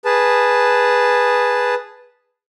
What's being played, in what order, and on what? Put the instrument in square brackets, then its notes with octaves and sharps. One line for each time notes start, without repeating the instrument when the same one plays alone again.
[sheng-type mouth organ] G#4 B4 A5